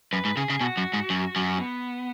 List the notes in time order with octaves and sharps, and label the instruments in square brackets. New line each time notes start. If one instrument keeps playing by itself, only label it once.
[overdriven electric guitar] F#2 [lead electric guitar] B4
[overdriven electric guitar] G#2
[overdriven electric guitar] C#3 [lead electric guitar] G#4
[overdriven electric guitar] C#3
[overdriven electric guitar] B2 [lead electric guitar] F#4
[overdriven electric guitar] F#2
G#2
F#2
F#2
[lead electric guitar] B3